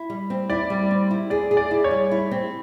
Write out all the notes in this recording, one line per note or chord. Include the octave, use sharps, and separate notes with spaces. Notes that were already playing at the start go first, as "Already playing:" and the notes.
Already playing: E4
G3
C4
E4 D5
G3
C4
E4
G#4 D5
G#4
D5
E4
C#5
G3
E4
C4